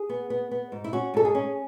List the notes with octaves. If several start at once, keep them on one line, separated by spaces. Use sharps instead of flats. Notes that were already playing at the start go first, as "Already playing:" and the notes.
Already playing: G#4
B3
B3
B3
G#2
E4
C#4 F#4
G#2 A4
G#4
C#4